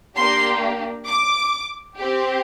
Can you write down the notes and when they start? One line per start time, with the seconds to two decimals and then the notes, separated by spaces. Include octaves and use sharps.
0.15 A#3 D4 G4 C6
1.07 D6
1.97 C4 G4